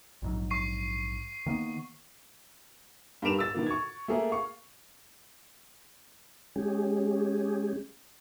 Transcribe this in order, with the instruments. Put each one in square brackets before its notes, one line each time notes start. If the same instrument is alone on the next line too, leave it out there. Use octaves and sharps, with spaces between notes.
[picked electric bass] A#1 G#2 F#3
[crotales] C#6 C7 D#7
[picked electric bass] D#3 A#3 B3
[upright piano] G2 G4 A#4 D7 E7 F7
E6 A6
B2 D#3 A#3
C#6 G#6
A3 A#3 G#4 A#4
F5 C#6
[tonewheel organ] G#3 C#4 G4 G#4